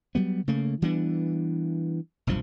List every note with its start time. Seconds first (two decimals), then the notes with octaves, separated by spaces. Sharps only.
0.15 F#3 G3 B3
0.48 C#3 A3 A#3
0.82 E3 G3 B3 D4
2.27 F1 B1 G2 F3